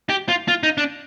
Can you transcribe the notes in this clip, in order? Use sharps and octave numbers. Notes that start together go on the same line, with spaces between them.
G4
F4
F4
D#4
D4